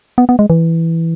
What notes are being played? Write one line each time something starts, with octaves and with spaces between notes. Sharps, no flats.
B3
B3
G#3
E3